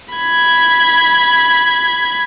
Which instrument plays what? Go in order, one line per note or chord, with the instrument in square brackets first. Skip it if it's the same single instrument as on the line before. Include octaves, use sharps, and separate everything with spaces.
[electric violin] B5 G#6